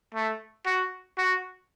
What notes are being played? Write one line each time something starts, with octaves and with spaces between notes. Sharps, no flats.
A3
F#4
F#4